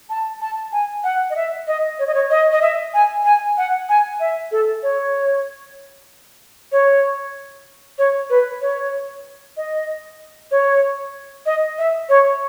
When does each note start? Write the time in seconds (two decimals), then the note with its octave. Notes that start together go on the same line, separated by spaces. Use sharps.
0.10 A5
0.41 A5
0.73 G#5
1.04 F#5
1.30 D#5
1.36 E5
1.67 D#5
1.99 C#5
2.07 D#5
2.14 C#5
2.30 D#5
2.52 D#5
2.62 E5
2.94 G#5
3.25 G#5
3.57 F#5
3.89 G#5
4.20 E5
4.52 A4
4.83 C#5
6.72 C#5
7.99 C#5
8.30 B4
8.62 C#5
9.57 D#5
10.51 C#5
11.46 D#5
11.78 E5
12.09 C#5